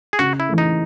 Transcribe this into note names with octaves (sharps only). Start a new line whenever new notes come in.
G#4
C#3 F#4
E4
E3 A3
D#4